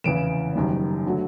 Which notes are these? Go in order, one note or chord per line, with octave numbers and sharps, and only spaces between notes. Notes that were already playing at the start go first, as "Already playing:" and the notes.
F1 E2 C#3 E3 D7 E7
F#1 F#2 D#3 G3
D3 F#3 A3